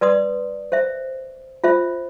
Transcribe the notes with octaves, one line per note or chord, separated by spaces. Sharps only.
B4 D5 C6 D#6
C5 E5
F4 C5 E5